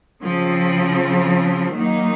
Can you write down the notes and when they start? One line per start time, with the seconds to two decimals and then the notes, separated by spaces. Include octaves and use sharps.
0.23 C#3 F3 C4
1.75 F#2 D#3 F#3 A#3 D#4